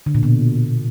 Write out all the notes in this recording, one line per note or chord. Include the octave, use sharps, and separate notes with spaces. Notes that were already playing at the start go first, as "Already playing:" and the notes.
D3
A#2
B2